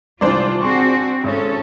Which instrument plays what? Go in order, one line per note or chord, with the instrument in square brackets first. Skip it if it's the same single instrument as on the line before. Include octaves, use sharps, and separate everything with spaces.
[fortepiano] C2 D#3 E3 [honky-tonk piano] D4 C5 D5 [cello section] F4
[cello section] C4 F#4 [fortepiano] G#4 C#6
[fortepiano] G#1 C#5 [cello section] C#4 A4